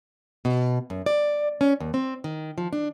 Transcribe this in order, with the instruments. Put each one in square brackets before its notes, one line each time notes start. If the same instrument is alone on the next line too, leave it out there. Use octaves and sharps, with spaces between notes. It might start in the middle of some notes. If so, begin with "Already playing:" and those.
[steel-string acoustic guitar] B2
F#2
D5
C#4
D#2
C4
D#3
F3
D4